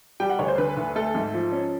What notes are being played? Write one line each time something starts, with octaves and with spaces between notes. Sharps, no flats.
G3 G5
F#5
D2 C#5
C5
D3 B4
D2
A3 A4
G#2
F3
C#4